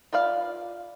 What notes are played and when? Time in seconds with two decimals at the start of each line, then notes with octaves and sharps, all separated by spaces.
0.13 F4 B4 D5 F5